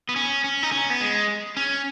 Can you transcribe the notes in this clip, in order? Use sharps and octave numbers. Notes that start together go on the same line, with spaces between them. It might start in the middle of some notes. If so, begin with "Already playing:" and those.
B3
C#4
C#4
D#4
C#4
B3
G#3
C#4